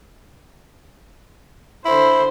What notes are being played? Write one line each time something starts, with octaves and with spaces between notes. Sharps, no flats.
D3 E4 C5